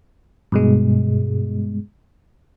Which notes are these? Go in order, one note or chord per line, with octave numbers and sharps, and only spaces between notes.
G2 B2 G#3